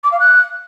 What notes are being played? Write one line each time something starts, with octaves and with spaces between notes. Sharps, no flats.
D6
F5
F#6